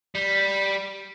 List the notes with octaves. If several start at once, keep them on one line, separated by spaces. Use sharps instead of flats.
G3